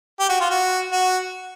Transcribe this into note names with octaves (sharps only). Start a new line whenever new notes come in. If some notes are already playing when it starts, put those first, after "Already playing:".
G4
F#4
F4
F#4
F#4